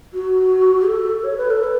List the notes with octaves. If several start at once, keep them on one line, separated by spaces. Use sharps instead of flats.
F#4
A4
C#5
B4
A4
B4